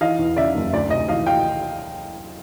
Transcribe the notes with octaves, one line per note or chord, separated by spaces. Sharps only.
E3 D#5 F5
E2
C#3 D5 E5
F#1
D2 D5
C3 D#5
E3 D#5 F5
F5 G5